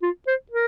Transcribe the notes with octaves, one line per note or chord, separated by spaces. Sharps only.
F4
C5
A#4